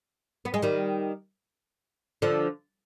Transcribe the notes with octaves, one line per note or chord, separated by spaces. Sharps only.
B3
G#3
D#3 G3
D3 F3